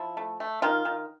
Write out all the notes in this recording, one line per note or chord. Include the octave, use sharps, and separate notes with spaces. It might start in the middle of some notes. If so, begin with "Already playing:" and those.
Already playing: F3 E4
A3
A3
D#3 F4
D#3